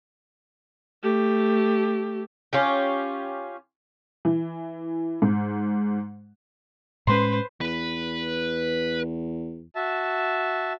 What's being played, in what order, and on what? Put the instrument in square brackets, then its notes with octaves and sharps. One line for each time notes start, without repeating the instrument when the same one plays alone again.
[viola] A3 G4
[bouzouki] C#4 F4 G4
[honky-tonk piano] E3
G#2
[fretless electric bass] A2 G#3 C#4 [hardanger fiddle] B4 C5 [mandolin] C6
[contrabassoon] E2 [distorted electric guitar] B4
[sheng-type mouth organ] F#4 E5 A5